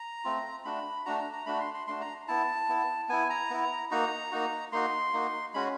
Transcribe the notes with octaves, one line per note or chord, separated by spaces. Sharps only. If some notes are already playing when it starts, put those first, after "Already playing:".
Already playing: A#5
A3 C4 F4
A3 D4 F#4 B5
A3 D4 F#4 A#5
A#5
A#5
A3 D4 F#4 B5
C6
C6
A3 D4 F#4 C6
A#5
B3 E4 A5
B3 E4
B3 E4 G#5
A#5
B3 E4
A#3 D#4 F#4 A#5
A#3 D#4 F#4
A#3 D#4 F#4 C6
A#3 D#4 F#4
G#3 C#4 F#4 B5